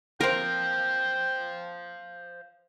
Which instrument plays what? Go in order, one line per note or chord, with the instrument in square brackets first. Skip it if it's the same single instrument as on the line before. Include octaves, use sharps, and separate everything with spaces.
[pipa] A#3 C4 [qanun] A#4 [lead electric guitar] C5 F5 [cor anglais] G5